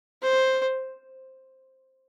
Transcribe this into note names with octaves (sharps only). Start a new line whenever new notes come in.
C5